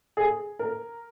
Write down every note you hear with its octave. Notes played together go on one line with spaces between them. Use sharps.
G#4
A#4